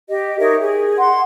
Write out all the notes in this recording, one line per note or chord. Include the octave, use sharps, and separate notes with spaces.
G4 D#5
D#4 A#4 C#5 E5
G#4
F#5 C6